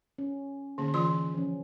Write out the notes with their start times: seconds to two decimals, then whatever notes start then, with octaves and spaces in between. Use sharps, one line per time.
0.18 C#4
0.78 A#2 D3 A#3 C#4 G#4
0.94 E3 F4 C6
1.34 F3 C#4